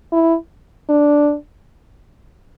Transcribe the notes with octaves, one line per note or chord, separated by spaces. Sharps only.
E4
D4